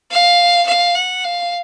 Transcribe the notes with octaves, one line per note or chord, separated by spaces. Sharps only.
F5
F5
F#5
F5